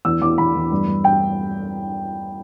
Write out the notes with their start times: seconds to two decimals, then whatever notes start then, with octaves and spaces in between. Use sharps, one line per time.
0.05 E2 E6
0.21 E2 D6
0.38 E2 B5
0.55 E2
0.72 G2
0.87 G2
1.04 G5